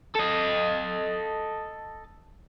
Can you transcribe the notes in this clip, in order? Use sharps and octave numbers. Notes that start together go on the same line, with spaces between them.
A4 D#5